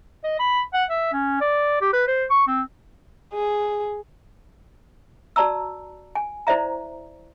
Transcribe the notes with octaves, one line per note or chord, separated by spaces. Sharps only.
D#5
B5
F#5
E5
C#4
D5
G4
B4
C5
C#6
C4
G#4
F#4 D5 A5 A#5 E6
G#5
E4 C5 D5 E5 A#5